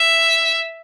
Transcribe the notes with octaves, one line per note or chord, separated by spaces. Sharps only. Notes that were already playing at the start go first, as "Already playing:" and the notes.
Already playing: E5